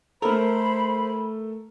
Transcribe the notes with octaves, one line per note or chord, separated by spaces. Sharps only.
A3 A4 A#4 C5 B5